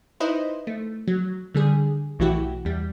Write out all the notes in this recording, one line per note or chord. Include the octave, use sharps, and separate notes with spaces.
D#4 E4 B4 C5 D#5
A3
F#3
D3 G3 G#4
B1 A2 E3 E4 F#4 G4
E2 G3